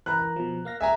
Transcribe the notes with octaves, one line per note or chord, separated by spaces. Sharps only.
E3 A#4 A#5 B5 F#6
A#5
B2 F3
A#3 F5 A#6
G#4 E5 G#5 A#5